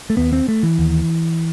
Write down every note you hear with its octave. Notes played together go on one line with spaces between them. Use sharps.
A3
D#2 B3
C4
A3
E3
D#2